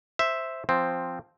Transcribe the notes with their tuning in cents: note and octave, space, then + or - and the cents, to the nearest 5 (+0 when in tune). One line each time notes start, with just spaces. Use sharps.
C5 +0 E5 +0
F3 +0 C4 +0